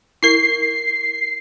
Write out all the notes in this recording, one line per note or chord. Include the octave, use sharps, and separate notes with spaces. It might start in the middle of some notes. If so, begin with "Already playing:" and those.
E4 A#4 C7